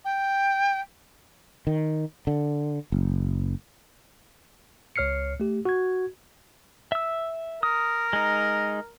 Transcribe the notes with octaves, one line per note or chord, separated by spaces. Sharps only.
G5
D#3
D3
F#1
C#2 C#5 F6 C7 C#7
A3 G4
F#4 G#6
E5 E6
A#4 D#6
G#3 D#4